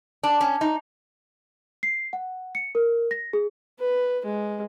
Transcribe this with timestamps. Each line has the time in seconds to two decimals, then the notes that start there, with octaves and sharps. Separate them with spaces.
0.23 D4
0.41 C#4
0.61 D#4
1.83 C7
2.13 F#5
2.55 C#7
2.75 A#4
3.11 A#6
3.33 G#4
3.80 B4
4.26 G#3